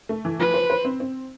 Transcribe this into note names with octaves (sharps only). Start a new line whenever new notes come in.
A3
E3
F3 B4
C5
C5
C4
C4